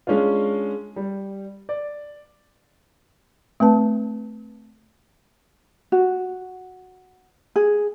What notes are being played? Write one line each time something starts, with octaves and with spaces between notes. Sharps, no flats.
G#3 C#4 D4 F4
G3
D5
A3 C4 B4 A5
F#4
G#4